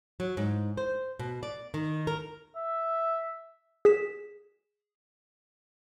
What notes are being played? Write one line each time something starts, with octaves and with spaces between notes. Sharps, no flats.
F#3
G#2
C5
B2
D5
D#3
A#4
E5
G#4 B6 E7